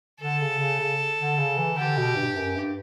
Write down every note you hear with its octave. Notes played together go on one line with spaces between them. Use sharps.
D3 A4
C#3
C#3
C#3
D3
C#3
E3
D3 G4
B2
G2
F#2
G2